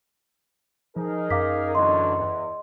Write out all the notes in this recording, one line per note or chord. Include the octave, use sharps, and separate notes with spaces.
F3 D#4 G#4 A#4
F#2 F5 D6 B6
E2 D3 F#3 D#5 C6
E2